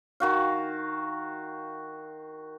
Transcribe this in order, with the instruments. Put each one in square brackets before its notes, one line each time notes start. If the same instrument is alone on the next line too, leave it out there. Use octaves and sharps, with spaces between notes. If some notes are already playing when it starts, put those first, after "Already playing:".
[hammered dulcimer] D#3 F#4 F5